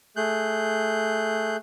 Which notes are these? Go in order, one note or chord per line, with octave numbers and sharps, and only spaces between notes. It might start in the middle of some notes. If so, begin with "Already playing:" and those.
A3 G#4 F#6 G6